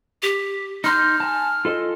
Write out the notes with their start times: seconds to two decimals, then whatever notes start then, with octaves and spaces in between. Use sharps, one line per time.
0.22 G4
0.84 D#4 C6 F6 G6
1.20 G#5 A5
1.65 F4 A4 D#5